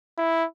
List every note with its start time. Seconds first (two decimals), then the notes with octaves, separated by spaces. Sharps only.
0.18 E4